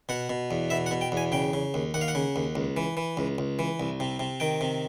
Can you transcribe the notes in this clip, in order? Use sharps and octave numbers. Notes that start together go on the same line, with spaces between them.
B2 F#5
B2
E2
B2 E5
F#5
B2
G5
E2 G#5
C#3 G5
C#3
D#2
D#2 F#5
F5
F#5
C#3
D#2
C#2
E3
E3
C#2
C#2
E3
C2
C3
C3
D#3 G5
C3